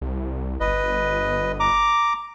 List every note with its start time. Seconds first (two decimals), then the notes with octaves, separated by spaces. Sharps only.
0.01 C2
0.60 G1 B4 D#5
1.60 A#5 D6